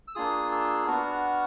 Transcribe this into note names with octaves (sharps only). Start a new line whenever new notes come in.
E6
A#3 D4 F4 G#4 D#6
E6
B3 D4 F#4 F6